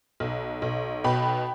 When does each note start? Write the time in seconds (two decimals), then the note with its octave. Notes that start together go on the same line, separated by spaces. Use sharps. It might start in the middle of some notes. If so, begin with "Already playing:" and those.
0.20 B1
0.62 B1
1.04 B2 G5 B5